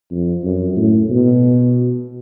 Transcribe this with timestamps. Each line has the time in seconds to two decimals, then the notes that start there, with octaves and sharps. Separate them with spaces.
0.11 F2
0.44 F#2
0.77 A2
1.10 B2